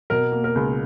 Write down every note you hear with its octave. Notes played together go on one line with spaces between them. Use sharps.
B2 A#4
A#3
A#4
C#2